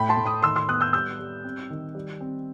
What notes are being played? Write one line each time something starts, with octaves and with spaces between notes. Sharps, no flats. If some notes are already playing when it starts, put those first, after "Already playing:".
Already playing: A2 G5 B5
A5 C6
A2
B5 D#6
D#3 C6 E6
C6 E6
B3 D#6 F#6
E6 G6
G3 E6 G6
G3
C4
D#3
G3
C4